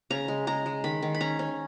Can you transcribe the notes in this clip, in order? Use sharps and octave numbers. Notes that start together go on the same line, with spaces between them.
C#3 A#5
G#3
G#3 A#5
G#3
D#3 B5
D#3
B5
C#4 A#5
C#4